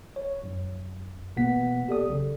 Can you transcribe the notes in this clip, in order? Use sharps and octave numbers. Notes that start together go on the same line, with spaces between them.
C#5
F#2
A1 B2 A#3 B3 F#5 B6
G4 A4 D5 D#6
B1 C#3